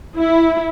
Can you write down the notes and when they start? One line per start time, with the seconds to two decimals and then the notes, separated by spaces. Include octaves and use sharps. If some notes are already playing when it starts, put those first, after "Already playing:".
0.17 E4